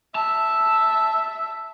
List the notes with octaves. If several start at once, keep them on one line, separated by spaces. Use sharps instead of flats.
E5 A5